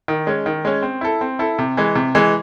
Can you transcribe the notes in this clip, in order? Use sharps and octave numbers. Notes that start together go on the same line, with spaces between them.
D#3
G#3 C#4
D#3
G#3 C#4
C4
E4 A4
C4
E4 A4
C3
E3 G#3
C3
E3 G#3